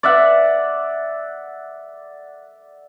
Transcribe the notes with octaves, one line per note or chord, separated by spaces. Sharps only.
D5 E5 F#5